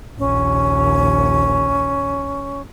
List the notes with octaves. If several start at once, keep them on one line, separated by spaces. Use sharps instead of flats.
A#1 D#2 C#4